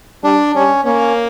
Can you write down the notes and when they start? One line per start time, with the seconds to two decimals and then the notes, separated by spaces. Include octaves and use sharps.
0.23 G3 D4
0.55 G3 C#4
0.85 A#3 C#4